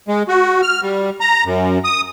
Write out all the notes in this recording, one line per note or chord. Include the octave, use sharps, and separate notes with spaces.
G#3
F#4
F6
G3
A#5
F#2
D#6